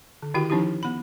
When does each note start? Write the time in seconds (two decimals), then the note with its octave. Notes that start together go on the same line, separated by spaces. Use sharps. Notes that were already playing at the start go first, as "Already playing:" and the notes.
0.22 D3
0.34 D#3 E4 F#4 G4 G5
0.50 F3 C#4 D#4 E4 G4
0.83 B3 B5